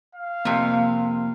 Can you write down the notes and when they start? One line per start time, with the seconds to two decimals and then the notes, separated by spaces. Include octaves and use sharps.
0.15 F5
0.45 F2 C3 A#3